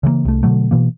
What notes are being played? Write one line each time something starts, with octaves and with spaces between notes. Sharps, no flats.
C#3 E3 G#3 A#3
C2 A3
B2 D3 F#3 A3
B2 E3 A#3